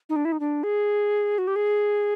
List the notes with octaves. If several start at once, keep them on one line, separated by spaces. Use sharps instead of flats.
D#4
D4
E4
D#4
D4
G#4
F#4
G4
G#4